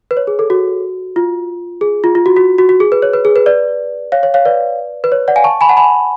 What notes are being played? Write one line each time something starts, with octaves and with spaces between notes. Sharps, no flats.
B4
C#5
G#4
A4
F#4
F4
G#4
F4
F4
F#4
F#4
F#4
F#4
G#4
B4
C#5
B4
G#4
B4
B4 D5
C#5 F5
C#5
C#5 F5
B4 D5
B4
C#5
D5 F#5
F5 G#5
A5 C#6
G#5 B5
F#5 A5
G#5 B5